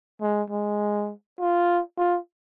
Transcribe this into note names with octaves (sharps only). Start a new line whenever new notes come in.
G#3
G#3
F4
F4